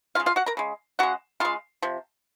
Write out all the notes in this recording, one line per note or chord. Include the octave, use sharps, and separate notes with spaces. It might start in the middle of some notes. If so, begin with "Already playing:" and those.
C#3 G#3 F4 F5
F4 F5
F#4 F#5
A#4 A#5
C#3 G#3
C#3 G#3 F#4 F#5
C#3 G#3 F4 F5
C3 F3